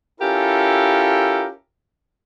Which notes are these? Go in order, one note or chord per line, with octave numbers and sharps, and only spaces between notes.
C#4 E4 F4 G4 A4 A#4